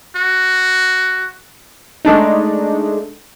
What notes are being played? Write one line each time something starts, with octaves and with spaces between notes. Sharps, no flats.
F#4
G#3 A3 D4 D#4